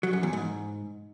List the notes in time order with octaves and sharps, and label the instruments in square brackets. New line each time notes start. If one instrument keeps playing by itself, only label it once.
[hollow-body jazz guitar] F#3
F#2
E2
G#2